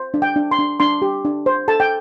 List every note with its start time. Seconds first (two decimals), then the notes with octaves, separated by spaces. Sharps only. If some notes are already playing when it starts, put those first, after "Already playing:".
Already playing: C5
0.14 D4
0.22 G5
0.36 D4
0.51 C6
0.59 D4
0.80 D4 C6
1.02 G4
1.25 D4
1.46 C5
1.68 A4 A5
1.80 G5